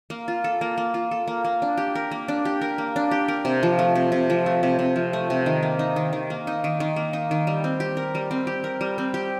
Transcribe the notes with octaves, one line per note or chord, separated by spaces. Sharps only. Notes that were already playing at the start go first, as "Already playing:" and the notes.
A#3
F4
A4
A#3
A#3
F4
A4
A#3
A#3
D4
G4
A#4
A#3
D4
G4
A#4
A#3
D4
G4
A#4
C3
F3
A3
C3
C3
F3
A3
C3
C3
F3
A3
C3
D#3
A#3
D#4
D#3
D#3
A#3
D#4
D#3
D#3
A#3
D#4
D#3
G3
C4
G4
A#4
G3
C4
G4
A#4
G3
C4
G4